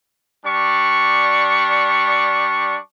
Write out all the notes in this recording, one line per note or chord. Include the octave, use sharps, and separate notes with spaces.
G3 D4 C#6